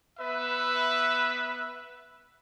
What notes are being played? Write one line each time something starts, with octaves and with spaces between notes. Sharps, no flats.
B3 B4 E5